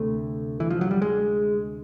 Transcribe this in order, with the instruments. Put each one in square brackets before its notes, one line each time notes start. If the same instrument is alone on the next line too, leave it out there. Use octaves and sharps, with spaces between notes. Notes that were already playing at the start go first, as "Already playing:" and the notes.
Already playing: [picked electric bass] D2 C3 A3
E3
F3
F#3
G3
G#3